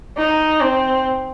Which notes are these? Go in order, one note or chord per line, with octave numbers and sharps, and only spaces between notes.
D#4
C4